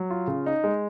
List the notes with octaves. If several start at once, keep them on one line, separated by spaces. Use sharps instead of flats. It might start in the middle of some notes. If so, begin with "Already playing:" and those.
Already playing: F#3
F4
C#3
D#4
G#3